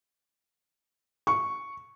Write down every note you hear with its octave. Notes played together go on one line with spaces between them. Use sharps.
C#6